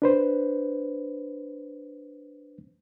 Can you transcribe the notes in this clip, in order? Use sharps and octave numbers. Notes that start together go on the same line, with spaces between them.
D4 B4 C5